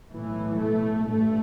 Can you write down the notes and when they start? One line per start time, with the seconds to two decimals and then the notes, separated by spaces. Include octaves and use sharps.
0.11 B1 A2 E3
0.58 A3
1.05 A1 G2 A3